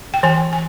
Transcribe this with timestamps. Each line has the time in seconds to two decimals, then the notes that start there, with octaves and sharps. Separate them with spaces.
0.14 G5
0.23 E3 G#5
0.53 G#5